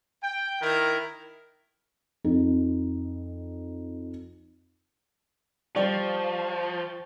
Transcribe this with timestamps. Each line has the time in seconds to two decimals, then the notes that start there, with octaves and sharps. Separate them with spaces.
0.22 G5
0.61 D#3 E4 A#4
2.24 F2 D#4
5.76 F3 G3 C5 D5 G5 C#6